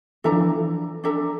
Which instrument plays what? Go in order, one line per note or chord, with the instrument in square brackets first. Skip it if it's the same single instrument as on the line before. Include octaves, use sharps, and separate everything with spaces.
[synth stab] E3 [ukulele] D4 A4 E5 A#5
[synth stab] F3
E3
[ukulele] D4 A4 E5 A#5